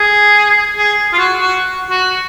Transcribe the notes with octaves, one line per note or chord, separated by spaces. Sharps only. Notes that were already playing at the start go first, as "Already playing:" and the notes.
Already playing: G#4
G#4
F4
F#4
F#4
F#4